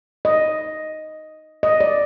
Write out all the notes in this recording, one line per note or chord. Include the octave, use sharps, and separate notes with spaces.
D#5
D#5
D5